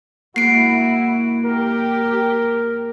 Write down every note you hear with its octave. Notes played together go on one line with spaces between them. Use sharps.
G#2 A#3 E4 F#4 C7 D7
G4 A#4